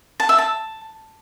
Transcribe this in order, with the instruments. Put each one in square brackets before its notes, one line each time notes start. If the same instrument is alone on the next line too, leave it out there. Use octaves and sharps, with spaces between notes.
[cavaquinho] A5
E5
A5